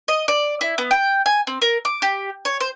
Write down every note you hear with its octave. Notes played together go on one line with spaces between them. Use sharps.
D#5
D5
E4
B3
G5
G#5
C4
A#4
D6
G4
C#5
C5